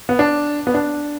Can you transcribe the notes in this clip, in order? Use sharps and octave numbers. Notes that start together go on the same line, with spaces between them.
B3
D4
B3
D4